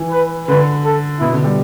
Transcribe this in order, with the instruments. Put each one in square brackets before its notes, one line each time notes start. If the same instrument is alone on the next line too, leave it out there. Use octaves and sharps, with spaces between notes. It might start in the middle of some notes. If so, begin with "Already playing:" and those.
Already playing: [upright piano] E3
[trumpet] B4
[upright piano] D3 [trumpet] B4
[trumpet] A4
[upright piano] B2 [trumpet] E4
[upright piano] D3
G3